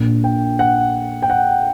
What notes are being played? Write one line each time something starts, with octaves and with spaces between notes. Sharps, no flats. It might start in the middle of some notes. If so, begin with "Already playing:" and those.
Already playing: A#1 A#2
G5
F#5
G5
F#5